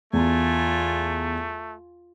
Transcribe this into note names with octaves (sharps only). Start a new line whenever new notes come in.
E2 A3 F4 G#5